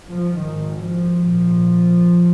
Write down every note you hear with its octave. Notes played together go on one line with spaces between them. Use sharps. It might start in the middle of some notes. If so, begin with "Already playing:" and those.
F3
G#1 G#2 D#3
F3
A#1 A#2